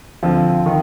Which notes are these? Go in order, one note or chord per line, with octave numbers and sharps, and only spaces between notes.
D3 F3 C4 F4
D#3